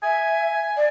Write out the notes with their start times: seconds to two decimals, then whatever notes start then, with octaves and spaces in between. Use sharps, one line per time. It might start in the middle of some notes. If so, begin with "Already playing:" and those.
0.03 E5 G#5
0.76 D5